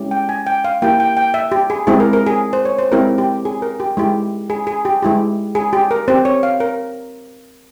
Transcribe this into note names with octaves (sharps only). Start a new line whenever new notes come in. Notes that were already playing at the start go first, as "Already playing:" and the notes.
Already playing: G#3 C#4 E4 G4
G5
G#5
G5
F5
A#3 E4 G4 G5
G5
G5
E5
G4
G#4
G#3 C4 E4 G4 G#4
A#4
A#4
G#4
C5
C#5
C5
G#3 C4 E4 G4 A#4
G4
G#4
A#4
G4
G#3 E4 G4
G#4
G#4
G4
G#3 E4 G4
G#4
G4
A#4
C4 G4 C5
C#5
F5
A#4